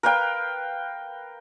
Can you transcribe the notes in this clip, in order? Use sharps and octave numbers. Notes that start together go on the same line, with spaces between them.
A#4 B4 F5 G5